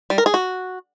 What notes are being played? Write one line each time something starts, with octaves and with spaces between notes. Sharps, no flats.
G3
A#4
G#4
F#4